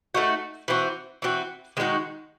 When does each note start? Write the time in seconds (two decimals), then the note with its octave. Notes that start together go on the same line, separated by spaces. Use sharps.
0.14 A3 D#4 F#4
0.68 E3 C4 F#4
1.22 E3 C4 F#4
1.77 D#3 G#3 D#4 F#4